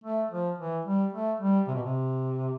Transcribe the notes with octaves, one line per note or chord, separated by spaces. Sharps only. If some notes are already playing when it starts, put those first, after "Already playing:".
A3
F3
E3
G3
A3
G3
C3
B2
C3